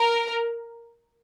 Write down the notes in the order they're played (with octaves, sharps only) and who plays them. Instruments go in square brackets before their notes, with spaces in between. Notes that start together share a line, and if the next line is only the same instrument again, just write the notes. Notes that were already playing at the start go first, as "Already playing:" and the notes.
Already playing: [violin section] A#4